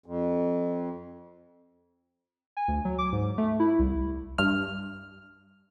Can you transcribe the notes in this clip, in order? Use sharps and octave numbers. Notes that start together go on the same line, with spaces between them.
F2
G#5
D2
F#3
D6
G#2
A3
E4
C2
G2 F6